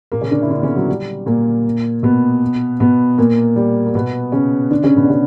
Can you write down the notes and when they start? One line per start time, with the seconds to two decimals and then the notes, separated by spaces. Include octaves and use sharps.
0.12 A#2 A#3
0.22 C#3 C#4
0.31 D3 D4
0.42 E4
0.50 D3 D4
0.60 B3
0.63 C#3 C#4
0.76 F#3
0.88 G3
1.26 A#2 A#3
2.03 B2 B3
2.80 B2 B3
3.18 A#2 A#3
3.56 G3
3.86 A#3
3.95 B2 B3
4.32 C#3 C#4
4.70 D3 D4
4.84 C#3 C#4
4.96 B2 B3
5.04 D4
5.09 C#3 C#4